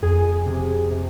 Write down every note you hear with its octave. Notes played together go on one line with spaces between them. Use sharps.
F2 G#4
C3
C3